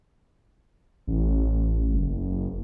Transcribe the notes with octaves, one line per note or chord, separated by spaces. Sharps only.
A1
F#1